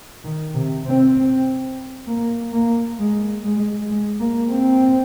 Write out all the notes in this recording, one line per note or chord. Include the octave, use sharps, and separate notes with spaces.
D#3
C3
C4
A#3
A#3
G#3
G#3
G#3
A#3
C4